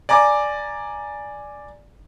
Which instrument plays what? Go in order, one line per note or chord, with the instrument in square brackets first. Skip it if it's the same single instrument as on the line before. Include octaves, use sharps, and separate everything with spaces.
[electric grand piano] D5 G#5 A#5 D6